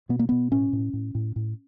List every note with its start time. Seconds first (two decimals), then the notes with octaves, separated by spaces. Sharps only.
0.09 B2 B3
0.19 A#3
0.29 B2 B3
0.51 A2 C#4
0.73 A2
0.93 A2
1.15 A2
1.36 A2